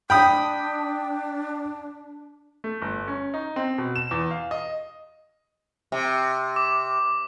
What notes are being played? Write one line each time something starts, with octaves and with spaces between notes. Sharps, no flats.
D4 G5 B5 D#6
A3
G1
C#4
D#4
C4
B2
E7
E2
F5
D#5
C3
D6